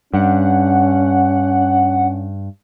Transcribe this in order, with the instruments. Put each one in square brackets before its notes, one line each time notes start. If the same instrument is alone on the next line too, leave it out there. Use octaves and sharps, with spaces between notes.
[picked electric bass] G2 [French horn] C#4 [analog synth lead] F#5